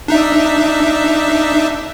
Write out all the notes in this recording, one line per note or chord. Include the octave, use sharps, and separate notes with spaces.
D4 D#4 E5